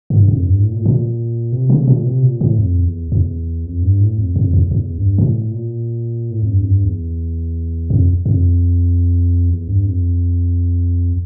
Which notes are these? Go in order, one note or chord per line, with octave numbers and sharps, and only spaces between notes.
G2
F2
G2
A2
A#2
A2
A#2
C3
C3
A#2
C3
A#2
A2
F2
E2
E2
F2
G2
A2
F2
F2
E2
E2
G2
A#2
A2
A#2
A2
F2
G2
F2
G2
E2
F2
F2
E2
G2
F2